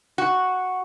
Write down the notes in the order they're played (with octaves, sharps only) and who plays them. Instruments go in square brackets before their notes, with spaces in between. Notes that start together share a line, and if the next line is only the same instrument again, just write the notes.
[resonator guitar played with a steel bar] F#4